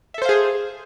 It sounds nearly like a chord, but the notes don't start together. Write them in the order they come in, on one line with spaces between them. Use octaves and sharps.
E5 A4 C5 F5 G#4